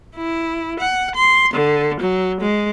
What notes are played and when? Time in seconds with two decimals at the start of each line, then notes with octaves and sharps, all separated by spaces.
0.15 E4
0.79 F#5
1.15 C6
1.54 D3
1.99 F#3
2.40 G#3